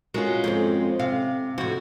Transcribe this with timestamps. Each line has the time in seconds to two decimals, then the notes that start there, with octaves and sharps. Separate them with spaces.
0.14 G#3 C#4 F4 F#4 A#4
0.44 F2 G#2 C4
0.99 C3 F5
1.58 F2 A2 F#4